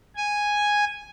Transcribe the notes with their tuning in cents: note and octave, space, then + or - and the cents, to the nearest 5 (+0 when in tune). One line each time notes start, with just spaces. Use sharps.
G#5 -5